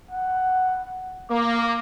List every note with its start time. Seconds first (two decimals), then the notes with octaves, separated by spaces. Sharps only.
0.11 F#5
1.30 A#3 D6